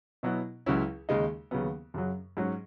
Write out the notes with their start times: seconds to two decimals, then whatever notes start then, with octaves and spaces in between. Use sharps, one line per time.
0.23 B2 F#3 B3 E4
0.66 C#2 C#3 F#3 C#4 E4
1.09 D#2 C#3 G#3 D#4
1.51 D#2 C#3 F#3 B3
1.94 F#2 C#3 F#3
2.37 G#2 F#3 C#4